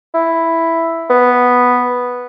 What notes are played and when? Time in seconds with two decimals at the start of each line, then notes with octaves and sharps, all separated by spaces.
0.14 E4
1.10 B3